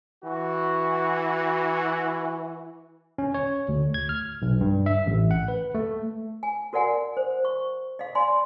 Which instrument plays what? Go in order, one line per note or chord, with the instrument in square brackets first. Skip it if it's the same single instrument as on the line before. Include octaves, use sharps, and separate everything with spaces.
[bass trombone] E3 [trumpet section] F#4
[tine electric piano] C#4
C#5
D2
G#6
F6
B1
G2
E5
A1
F#5
B4
A3
[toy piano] G#5
F#4 A#4 D5 F#5 G#5
C5
C#6
D#5 F5
D5 G#5 B5 C6